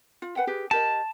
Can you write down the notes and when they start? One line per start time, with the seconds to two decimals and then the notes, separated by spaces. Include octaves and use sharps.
0.22 F4
0.36 B4 F#5 G5
0.47 G4 G#4 B4
0.71 G4 A#4 D#5 A5